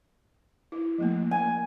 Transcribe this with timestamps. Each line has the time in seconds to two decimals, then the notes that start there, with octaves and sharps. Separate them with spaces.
0.72 E4
0.98 F3 A3 A#3
1.31 G#5